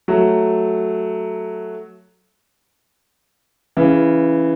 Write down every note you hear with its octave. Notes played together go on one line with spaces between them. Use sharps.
F#3 A3
C#3 E3